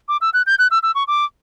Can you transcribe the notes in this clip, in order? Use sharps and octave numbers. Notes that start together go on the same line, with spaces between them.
D6
E6
F#6
G6
F#6
E6
E6
C#6
D6